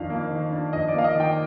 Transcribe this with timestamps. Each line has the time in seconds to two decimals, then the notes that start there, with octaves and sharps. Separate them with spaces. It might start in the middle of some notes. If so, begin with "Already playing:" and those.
Already playing: F2 D#3 D4 F5
0.10 A#3
0.31 D#3
0.52 D4
0.73 F2 D#5
0.88 D5
0.94 A#3 F5
1.04 D#5
1.15 D#3
1.20 G5